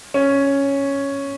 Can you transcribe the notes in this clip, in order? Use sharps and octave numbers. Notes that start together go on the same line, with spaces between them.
C#4